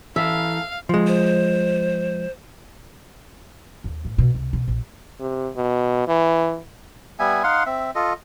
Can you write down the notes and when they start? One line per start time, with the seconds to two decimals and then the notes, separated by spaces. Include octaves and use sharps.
0.16 E3 A4 E5 F5
0.89 F3 G#3
1.07 C5
3.84 D#2
4.05 A2
4.18 B2
4.34 C2
4.53 B2
4.68 A#1
5.20 C3
5.56 B2
6.08 E3
7.19 G3 B3 E5 G#5
7.43 D#4 F5 F#5 C6
7.66 C4 E5
7.95 F4 A4 D#5